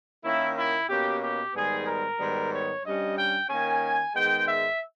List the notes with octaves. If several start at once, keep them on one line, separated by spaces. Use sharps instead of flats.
D#3 A#3 C#4 E4
E4
B2 A#3 C#4 G4
G4
G#2 D#3 G3 B3 G#4
A#4
G#2 D#3 G3 B3
C#5
G2 G3 C#4 D#5
G5
D#3 A#3 C#4 G#5
G#2 D#3 G#3 B3 G5
E5